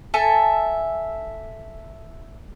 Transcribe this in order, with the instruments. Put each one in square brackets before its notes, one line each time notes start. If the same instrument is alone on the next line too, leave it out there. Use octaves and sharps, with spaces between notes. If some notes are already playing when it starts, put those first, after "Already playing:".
[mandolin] A4 E5 G#5 A5